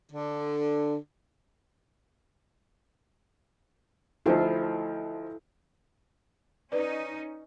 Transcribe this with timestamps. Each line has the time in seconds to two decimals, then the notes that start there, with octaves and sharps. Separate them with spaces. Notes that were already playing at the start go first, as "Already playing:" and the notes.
0.11 D3
4.26 D2 F3 D#4 E4 A4 F5
6.72 C#4 D#4 B4 D5